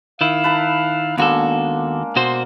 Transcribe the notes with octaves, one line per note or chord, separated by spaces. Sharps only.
D#3 E4 F5
B4 A5 A#5
D#2 G#3 A#3 B3 D4 F#4 A4
B2 F#4 C5 C6